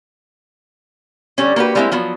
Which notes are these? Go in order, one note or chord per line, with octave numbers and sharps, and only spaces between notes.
D3 G3 C#4
A#3 F#4 G4 B4
G3 G#3 A#3 C4 C#4 E4
F3 F#3 B3